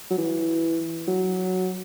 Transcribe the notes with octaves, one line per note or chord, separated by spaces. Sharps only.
F#3
E3
F#3